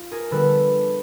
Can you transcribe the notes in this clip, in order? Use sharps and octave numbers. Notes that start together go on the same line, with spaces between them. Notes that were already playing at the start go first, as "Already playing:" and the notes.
Already playing: F4
G#4 A#4
D3 G3 B3 A4 B4